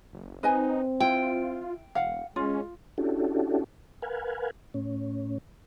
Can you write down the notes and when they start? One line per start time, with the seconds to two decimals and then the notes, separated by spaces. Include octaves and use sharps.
0.13 F#1
0.43 C4 D#4 B4 D#5 G#5
1.00 E4 F4 G5
1.95 E1 F5 F#5
2.36 G#3 C#4 F4
2.98 C#4 D4 E4 F#4 G4 A4
4.02 A#4 B4 F5 F#5 G#5
4.74 A2 C#4